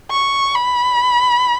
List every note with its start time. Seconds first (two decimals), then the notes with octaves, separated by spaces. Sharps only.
0.11 C#6
0.55 B5